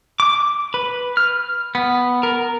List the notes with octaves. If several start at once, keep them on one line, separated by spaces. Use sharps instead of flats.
D6
B4
F6
B3
A#4